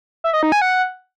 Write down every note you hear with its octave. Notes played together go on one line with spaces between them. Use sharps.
E5
D#5
D#4
G#5
F#5